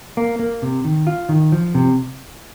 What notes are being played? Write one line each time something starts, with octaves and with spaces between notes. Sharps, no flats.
A#3
A#3
C3
D#3
F4
D#3
F3
C3